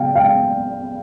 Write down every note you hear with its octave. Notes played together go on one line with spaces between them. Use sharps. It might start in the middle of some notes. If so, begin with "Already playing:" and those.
Already playing: C#3 F#3 F5 G5
F5 G5